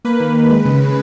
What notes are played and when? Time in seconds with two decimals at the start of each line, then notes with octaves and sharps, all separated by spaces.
0.05 A#3 B4
0.20 D#3
0.35 D#3
0.50 G#3
0.65 C#3
0.80 C#3